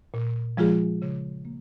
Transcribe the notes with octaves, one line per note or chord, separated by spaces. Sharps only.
A#2
F3 G#3 F4 G#4
C#3
A#3